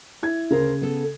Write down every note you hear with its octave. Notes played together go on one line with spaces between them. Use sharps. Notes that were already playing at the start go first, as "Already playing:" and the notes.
E4 G#6
D2 C#3 A#4 C5
B3 A4